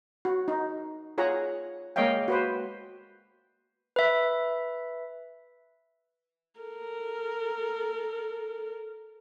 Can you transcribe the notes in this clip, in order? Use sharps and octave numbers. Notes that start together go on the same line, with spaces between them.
F#4
D#4
F4 G#4 C#5 F#5 A#5
G#3 A#3 C#5 D#5 F5 G5
F#4 B4 C5
B4 E5
A4 A#4